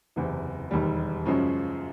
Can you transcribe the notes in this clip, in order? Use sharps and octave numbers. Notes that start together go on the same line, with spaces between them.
F#1 E2 C3
E1 D#2 D#3 G3
F#2 C#3 F3 G#3 C#4